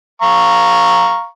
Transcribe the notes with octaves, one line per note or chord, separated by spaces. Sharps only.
F5 A#5 C#6